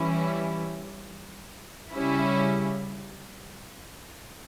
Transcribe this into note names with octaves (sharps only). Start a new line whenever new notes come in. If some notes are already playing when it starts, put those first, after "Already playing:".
Already playing: E3 G3 C#4 E4
C#3 G3 C#4 E4